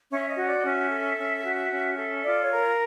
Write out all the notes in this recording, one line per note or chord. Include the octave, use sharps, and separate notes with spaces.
C#4 E5
D#5
F#4
D5
D#5
C#4 E5
A4
C#4
F#4
C#4
A4
F4 D5
C#5
A#4